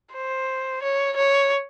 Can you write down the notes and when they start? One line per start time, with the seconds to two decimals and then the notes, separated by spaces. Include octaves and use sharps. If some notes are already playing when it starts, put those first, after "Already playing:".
0.14 C5
0.83 C#5
1.16 C#5